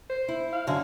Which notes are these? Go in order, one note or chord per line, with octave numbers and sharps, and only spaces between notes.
C5
E4
F5
F#2 D3 F#3